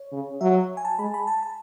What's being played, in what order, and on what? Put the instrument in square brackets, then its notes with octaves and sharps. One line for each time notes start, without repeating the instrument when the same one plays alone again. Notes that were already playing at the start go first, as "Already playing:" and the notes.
Already playing: [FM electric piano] C#5
[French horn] C#3
[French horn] F#3 [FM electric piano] E5
[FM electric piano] G#5
A5
[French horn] G#3 [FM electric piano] B5
[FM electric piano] B5
A5
A5